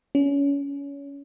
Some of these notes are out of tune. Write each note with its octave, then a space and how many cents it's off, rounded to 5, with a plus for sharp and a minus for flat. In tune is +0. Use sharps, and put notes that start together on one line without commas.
C#4 +25